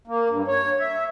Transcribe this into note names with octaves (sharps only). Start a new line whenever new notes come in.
A#3
G2
C#5
E5